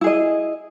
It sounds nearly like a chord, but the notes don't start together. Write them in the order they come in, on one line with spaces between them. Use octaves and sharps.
E4 G#4 D#5